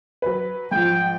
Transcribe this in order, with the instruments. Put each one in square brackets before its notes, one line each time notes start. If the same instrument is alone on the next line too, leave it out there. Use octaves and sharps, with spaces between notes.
[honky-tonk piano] F#3 B4
[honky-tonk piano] G#2 F3 [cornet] G5